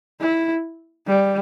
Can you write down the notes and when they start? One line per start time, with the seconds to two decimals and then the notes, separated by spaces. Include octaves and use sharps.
0.21 E4
1.07 G3